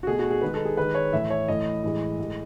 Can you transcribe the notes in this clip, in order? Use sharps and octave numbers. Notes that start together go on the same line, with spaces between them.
F#4
B2 A3 G#4
F#4
G#4
D#3 G#3 B4
A4
G#4
D#3 G#3 B4
C#5
A2 E3 A3 E5
C#5
A2 E3 A3 D#5
A2 E3 G#3
A2 G#3